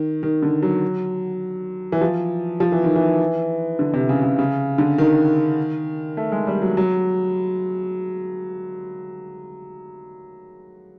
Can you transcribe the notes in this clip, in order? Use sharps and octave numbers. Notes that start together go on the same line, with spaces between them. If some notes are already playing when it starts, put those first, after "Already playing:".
Already playing: D#3
D#3
D3
F#3
E3
F3
F3
E3
D#3
E3
D3
C3
C#3
C#3
C#3
D3
D#3
A3
G#3
G3
F#3
F#3